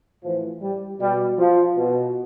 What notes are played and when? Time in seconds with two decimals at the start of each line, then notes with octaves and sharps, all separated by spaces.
0.23 A2 E3 F3
0.62 G3
1.00 B2 G3
1.38 F3
1.77 B2